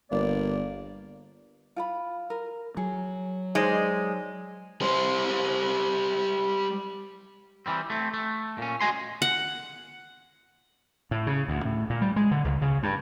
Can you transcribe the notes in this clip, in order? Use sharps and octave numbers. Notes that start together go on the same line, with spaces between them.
G1 A#3 D5
F4 G5 B5
A#4
F#3 G#4
G#3 D#4 C5 D5
G3 C5
E3 G3 C4
A3 C4
A3
A#2 C#4
F#4 D#5 G#5 C6
F#5
A2
C#3
D2
A2
A#2
G3
G#3
D3
C#2
C#3
G2